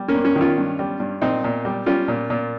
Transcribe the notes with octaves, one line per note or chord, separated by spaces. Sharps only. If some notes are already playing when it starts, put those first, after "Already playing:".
Already playing: G3
A#3 C#4
G2
A#3 C#4
D#3 C#4 F4
G2
G3
G2
A#2 C4 D#4
A#2
G3
G3 C#4 F4
A#2
A#2